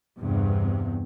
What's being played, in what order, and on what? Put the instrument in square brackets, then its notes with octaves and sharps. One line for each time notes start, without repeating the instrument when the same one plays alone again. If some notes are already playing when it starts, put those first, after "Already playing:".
[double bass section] E2 G2 C3